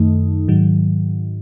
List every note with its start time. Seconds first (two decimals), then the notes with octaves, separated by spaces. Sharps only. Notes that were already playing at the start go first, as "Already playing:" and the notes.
Already playing: F#2 D#3 A3 D#4
0.48 G#2 D#3 F#3